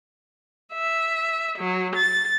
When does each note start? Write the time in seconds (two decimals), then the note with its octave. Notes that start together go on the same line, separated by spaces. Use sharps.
0.73 E5
1.57 F#3
1.95 A6